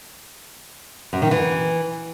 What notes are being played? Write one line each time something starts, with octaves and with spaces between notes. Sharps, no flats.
F#2
D#3
E3